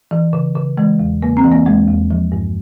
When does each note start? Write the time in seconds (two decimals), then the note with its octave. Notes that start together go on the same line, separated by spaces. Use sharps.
0.11 E3
0.33 C#3
0.55 C#3
0.78 E3 G#3
0.99 E2
1.22 C#3 A#3
1.37 C4
1.44 E3
1.52 A#3
1.66 E2 G#3
1.89 E2
2.11 F3
2.32 G2